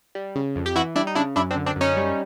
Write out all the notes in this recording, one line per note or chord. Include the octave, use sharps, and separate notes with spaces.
G3
C#3
F2
G4
E3 E4 F#4
G3 D4 E4
D#4
C#3 D4 E4
F#2 D4 E4
C4 D4
D3
C4 D4
F#2 C#4 D#4
G3